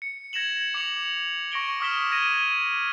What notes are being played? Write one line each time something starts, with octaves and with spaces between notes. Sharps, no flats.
C#7
G#6 A#6 C#7 E7 F#7
D6 C#7 F7 F#7
C#6 A#6 D7 G7
D6 D#6 F6 B6 E7 G7
G#6 A#6 D#7